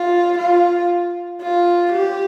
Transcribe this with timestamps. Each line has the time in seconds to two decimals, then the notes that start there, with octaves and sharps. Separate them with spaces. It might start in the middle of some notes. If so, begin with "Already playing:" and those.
Already playing: F4
0.39 F4
1.42 F4
1.93 G4